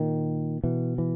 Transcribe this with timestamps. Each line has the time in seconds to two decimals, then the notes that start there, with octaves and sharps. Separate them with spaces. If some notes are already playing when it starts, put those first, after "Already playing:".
Already playing: A#2 D#3
0.64 B2 E3
0.98 E3